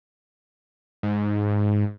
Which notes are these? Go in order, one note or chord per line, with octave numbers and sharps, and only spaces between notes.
G#2